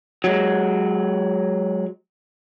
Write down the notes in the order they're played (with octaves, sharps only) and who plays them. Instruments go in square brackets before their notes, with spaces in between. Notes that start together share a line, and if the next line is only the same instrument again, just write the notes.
[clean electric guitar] F#3 G#3